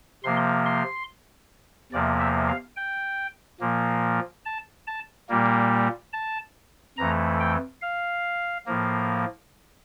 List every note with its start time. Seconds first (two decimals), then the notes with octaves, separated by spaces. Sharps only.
0.24 C3 F3 A#3 C6
0.65 C6
1.92 E2 C3 F3 A#3 D5
2.20 E5
2.48 F5
2.77 G5
3.61 A#2 F3 A#3
4.45 A5
4.87 A5
5.29 A#2 G3 A#3
6.13 A5
6.97 F2 E3 A3 A#5
7.40 G5
7.82 F5
8.66 A2 F3 A#3